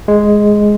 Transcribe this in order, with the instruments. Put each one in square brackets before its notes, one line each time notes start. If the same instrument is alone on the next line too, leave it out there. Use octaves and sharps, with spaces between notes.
[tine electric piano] G#3